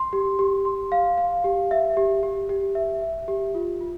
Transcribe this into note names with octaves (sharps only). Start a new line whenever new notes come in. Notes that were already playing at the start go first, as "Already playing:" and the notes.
Already playing: C6
G4
G4
C6
F5
F5
G4
E5
G4
G4
G4
E5
E5
G4
F4
F4